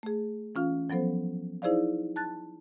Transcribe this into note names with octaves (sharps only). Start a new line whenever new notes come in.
A3 G#4
E3 C#4 F4 F5
F3 F#3 B3 A4 C5
D#4 E4 G#4 C5 D5 F5
A5 F#6 A6